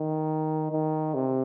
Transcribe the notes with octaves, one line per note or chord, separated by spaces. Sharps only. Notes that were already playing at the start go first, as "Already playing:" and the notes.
Already playing: D#3
D#3
C3